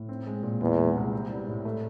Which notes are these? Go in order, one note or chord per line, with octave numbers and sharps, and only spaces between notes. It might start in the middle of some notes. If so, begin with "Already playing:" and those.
Already playing: A2
C4
G#3
A#2
E2 B3
G#3
C2
C4
G3
A2
A3